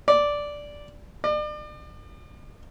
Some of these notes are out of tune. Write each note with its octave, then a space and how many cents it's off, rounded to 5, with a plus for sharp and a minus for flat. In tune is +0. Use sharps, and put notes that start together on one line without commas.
D5 -5
D5 +40